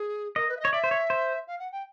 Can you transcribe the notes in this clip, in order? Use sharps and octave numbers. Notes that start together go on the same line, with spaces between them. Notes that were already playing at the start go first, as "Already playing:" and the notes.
Already playing: G#4
A#4 D#5
B4
E5
C#5 D#5
D5 E5
C5
C#5
C5
F5
F#5
G5